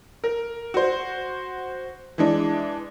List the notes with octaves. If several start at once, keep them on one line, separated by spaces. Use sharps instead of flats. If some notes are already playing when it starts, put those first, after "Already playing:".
A#4
F#4 C5
E3 G#3 D4